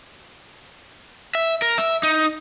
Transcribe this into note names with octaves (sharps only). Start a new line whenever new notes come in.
E5
A#4
E5
D#4